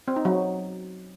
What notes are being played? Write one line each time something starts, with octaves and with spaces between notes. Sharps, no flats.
C4
D#4
F#3